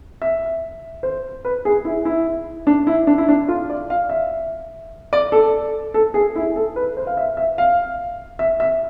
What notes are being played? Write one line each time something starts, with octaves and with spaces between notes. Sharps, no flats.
E5
C5
B4
G#4
E4
E4
D4
E4
D4
E4
D4
F4
D5
F5
E5
D5
A4
A4
G#4
E4
A4
B4
C5
F5
E5
E5
F5
E5
E5